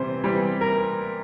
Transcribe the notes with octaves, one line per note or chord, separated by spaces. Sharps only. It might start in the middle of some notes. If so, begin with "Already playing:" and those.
Already playing: C3 E3 G3 C4 C5
E3 G3 C4
A#4